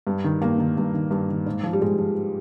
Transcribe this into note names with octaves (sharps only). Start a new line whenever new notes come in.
G2
D#3
G2 A#3
D#3
G2
D#3
G2
D#3
G#2
F3
G3
G#2 G#3
F3